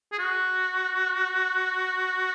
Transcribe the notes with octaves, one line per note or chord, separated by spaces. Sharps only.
G#4
F#4